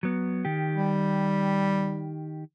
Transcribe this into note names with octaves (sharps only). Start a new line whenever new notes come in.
F#3 B3
D#3 G4
G3